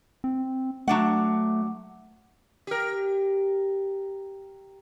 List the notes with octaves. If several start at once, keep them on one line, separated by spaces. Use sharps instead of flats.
C4
F#3 A3 D4 F#5
G4 A#4